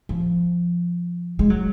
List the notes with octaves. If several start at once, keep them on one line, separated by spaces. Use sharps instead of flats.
F3
G#3
F#3